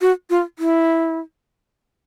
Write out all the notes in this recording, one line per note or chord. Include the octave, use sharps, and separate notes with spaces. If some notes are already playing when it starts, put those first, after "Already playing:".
F#4
F4
E4